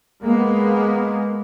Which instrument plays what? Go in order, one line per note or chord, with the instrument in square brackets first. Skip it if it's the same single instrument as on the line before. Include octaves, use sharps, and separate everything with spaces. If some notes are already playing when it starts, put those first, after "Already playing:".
[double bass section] G#3 A#3 B3